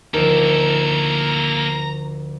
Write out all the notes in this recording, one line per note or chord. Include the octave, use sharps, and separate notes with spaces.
D2 D#3 F3 A#3 A4 A#5